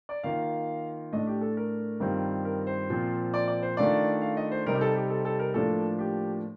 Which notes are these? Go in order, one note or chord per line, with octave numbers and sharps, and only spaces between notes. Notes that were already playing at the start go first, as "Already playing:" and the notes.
D5
D#3 A#3 F4 F5
A2 A3 D4 D#5
G4
A4
A#4
G2 D#3 G3 C4 F4
A#4
C5
A#2 F3 C4
D5
D5
C5
D#3 A3 D4 F4 D5
F5
D#5
C5
C3 G3 C4 D#4 A#4
G4
A4
G4
A4
A4
A#4
A2 F3 A#3 D4 A4
G4